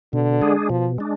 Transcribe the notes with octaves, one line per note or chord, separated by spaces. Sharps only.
B2 D3
G#3 D4 G#4
B2 F3
G#3 D4